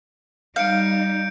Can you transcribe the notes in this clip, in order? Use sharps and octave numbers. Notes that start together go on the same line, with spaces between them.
G3 D#4 F5 G6 C#7 D7